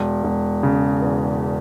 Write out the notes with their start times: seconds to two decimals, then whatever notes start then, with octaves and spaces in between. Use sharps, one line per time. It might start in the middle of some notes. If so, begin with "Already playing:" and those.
Already playing: E1
0.24 E1
0.63 C#3
1.01 E2